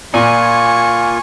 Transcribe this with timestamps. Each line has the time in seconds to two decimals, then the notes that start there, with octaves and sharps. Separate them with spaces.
0.14 A#2 A#3 F4 G#5 C#6